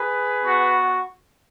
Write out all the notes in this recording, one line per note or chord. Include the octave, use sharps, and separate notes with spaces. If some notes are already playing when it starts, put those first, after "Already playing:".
Already playing: G#4 B4
B3 F#4